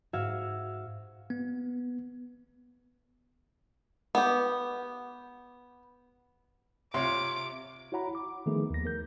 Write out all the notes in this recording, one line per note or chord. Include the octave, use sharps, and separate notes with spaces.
G#2 F#4 E5 F5 E6 G#6
B3
B3 G4
C3 F4 C#5 C6 D6
E4 F#4 C#5 F#5 A#5 B5
D6
D#3 F3 A3 B3 D#4 G#4
D#2 A#6
A#4 G6